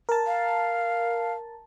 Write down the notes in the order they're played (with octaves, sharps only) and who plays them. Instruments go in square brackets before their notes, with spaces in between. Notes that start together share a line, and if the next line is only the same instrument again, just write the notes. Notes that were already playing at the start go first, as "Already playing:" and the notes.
[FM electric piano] A#4 A5
[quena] F5